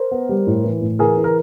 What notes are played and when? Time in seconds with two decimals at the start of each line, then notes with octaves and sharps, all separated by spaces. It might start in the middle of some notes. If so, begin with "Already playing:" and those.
Already playing: A#4 C5
0.11 B3
0.29 G3
0.47 A2
0.64 E3
0.81 A2
0.99 E3 G#4 A#4
1.17 E3
1.24 A#4